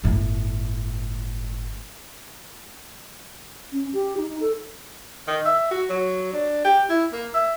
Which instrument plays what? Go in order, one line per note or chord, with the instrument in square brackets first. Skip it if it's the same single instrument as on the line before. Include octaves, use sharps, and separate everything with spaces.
[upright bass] G1 A2
[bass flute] C#4
G4
D#4
A4
[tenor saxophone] D#3
E5
F#4
F#3
D4
G4
E4
A#3
E5